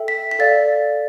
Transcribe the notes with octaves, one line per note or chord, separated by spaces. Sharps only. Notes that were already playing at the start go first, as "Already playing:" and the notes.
Already playing: A4 E5 G5
B6
B6
A4 D5 F5 A6